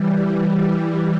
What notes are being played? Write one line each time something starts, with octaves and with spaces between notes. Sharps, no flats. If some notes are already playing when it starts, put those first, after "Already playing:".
Already playing: E3 G3